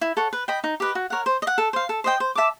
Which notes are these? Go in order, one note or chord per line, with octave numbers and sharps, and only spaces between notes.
E4
A4 C#5 F#5
B4
D#5 G5 B5
D#4
G4 B4 D#5
F#4
A#4 C#5 F#5
C5
D#5
F#5
A4
C5 F5
A4
C5 D#5 G5
C5
E5 A5 D6